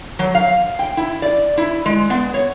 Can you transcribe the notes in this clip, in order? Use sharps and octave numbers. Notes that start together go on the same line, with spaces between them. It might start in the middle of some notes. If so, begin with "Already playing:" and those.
F#3
F5
G5
E4
D5
E4
G#3
B3
C#5